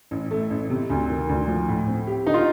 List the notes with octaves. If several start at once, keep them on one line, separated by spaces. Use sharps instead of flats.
A1
A3
A1
C3
D2
D#3
D2
F3
A2
C4
G4
D3 D#4
F4